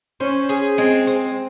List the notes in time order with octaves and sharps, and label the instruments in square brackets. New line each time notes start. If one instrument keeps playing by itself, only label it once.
[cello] C#4 [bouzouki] C5
[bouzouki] G#4
[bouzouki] G#3 [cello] C4
[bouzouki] C4